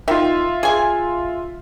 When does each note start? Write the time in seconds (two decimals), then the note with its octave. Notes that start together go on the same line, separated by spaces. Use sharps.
0.08 D#3 F4 E5
0.63 G#4 G#5